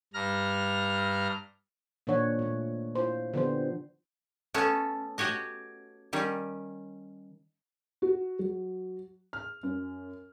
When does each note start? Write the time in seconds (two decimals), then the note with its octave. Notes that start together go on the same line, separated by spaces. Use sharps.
0.14 G2 A#5 F6 A#6
2.07 A#2 D#3 F3 D4 C#5 F#5
2.39 A#2 A3
2.95 E4 F4 C5
3.34 D3 F3 B3 D4 G4 C5
4.54 A3 B3 C#4 A4
5.18 F#4 G4 C#5 D#5
6.13 D#3 G3 C#4
8.02 F#4
8.39 F#3
9.33 F6
9.63 F#2